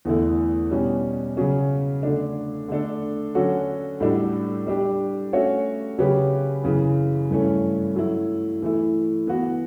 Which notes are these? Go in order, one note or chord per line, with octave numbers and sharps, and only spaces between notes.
E2 D3 A3 E4
B2 G3 C#4
C#3 F#3 C#4
D3 A3 D4
D3 A3 D4 A4
D3 F#3 C#4 F#4 A4
A2 G3 D4 F#4 A4
G3 D4 G4
A3 C#4 F#4 C#5 E5
C#3 F#3 C#4 G4 B4
F#2 C#3 E3
G2 E3 A3 C#4
F#3 A3 E4
E3 A3 E4
E3 B3 F#4